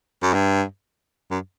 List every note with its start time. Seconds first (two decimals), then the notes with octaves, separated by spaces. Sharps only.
0.22 F#2
0.34 G2
1.31 F#2